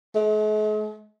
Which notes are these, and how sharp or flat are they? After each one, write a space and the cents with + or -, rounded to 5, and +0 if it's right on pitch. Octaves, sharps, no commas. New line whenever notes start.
G#3 +45